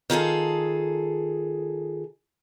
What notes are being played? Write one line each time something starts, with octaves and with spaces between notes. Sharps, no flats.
D#3 F4 G#4 A4